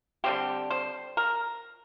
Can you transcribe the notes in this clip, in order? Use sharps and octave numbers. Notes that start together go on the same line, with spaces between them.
D3 G3 C4 G4
C5
A#4